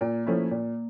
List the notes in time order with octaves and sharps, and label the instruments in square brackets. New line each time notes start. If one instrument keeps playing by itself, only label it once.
[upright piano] A#2 [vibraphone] A#3
[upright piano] F3 A3 C#4 E4
A#2